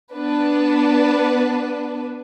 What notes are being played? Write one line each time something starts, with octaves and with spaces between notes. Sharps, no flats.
B3 D4 B4